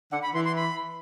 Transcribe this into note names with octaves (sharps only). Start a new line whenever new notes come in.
D3 F#5
B5
E3 C6
C6
B5